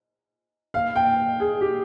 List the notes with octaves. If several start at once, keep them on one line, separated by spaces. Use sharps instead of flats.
F5
G5
G#4
G4